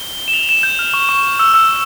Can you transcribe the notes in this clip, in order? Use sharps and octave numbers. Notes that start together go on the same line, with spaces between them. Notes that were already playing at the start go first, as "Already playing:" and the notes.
Already playing: G7
E7
F7
E7
G6
F6
C#6
C#6
E6
E6